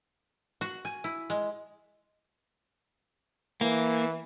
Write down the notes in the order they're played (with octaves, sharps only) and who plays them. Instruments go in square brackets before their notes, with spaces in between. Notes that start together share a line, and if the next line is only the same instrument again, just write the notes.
[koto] F#4
G#5
E4
G#3
[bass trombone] E3 [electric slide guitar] A#3